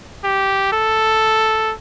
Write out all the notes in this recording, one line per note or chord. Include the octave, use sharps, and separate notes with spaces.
G4
A4